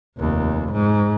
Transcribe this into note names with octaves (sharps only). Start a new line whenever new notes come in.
F1 D#2
G#2